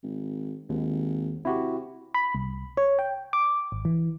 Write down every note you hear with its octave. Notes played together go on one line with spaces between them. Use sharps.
G#1
G#1 D#2
C3 E4 F#4 G4
B5
C2
C#5
G5
D6
G#1
E3